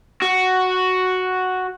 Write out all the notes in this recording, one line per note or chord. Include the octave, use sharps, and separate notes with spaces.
F#4